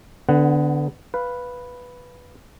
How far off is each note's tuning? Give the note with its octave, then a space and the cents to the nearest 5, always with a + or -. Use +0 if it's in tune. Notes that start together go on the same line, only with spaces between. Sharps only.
D3 +0 B3 +25 F#5 +0
B4 +0 F5 +0